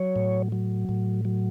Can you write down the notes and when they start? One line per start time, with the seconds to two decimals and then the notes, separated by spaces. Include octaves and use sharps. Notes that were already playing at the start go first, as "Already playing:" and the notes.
Already playing: F#3 C#5
0.16 A2
0.52 F#3
0.89 A2
1.25 F#3